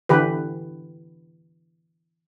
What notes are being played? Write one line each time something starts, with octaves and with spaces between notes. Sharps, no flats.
D3 E3 G4 B4